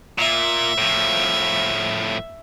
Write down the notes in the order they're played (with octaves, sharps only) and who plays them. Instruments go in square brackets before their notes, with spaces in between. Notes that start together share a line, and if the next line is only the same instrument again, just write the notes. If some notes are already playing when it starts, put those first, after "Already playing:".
[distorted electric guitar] A#2 [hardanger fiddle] E5
[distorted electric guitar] A2 F3